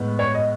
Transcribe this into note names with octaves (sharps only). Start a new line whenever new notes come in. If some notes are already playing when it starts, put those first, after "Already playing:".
Already playing: A2 G#3 B3
C#5
D#5